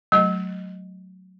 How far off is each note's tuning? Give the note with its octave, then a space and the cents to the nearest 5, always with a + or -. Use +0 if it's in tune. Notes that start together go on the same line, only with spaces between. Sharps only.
F#3 +0 A3 -15 D#5 +0